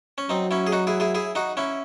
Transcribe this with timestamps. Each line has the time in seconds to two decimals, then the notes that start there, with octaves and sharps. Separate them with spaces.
0.18 C#4
0.29 F#3 C4 D#4
0.51 C#4 E4
0.67 G#4
0.72 D#4 F#4
0.87 E4 G#4
1.00 E4 G#4
1.15 E4 G#4
1.35 D#4 F#4
1.57 C#4 E4